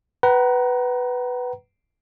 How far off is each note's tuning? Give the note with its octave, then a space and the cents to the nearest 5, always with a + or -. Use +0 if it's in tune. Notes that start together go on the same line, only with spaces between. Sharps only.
B4 +0 F#5 +40 A#5 +20